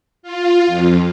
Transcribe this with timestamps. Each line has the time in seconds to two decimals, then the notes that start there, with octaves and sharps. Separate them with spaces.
0.23 F4
0.67 F2